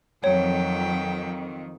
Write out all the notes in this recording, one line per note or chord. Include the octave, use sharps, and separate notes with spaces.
F2 D#3 F#3 C#5 G5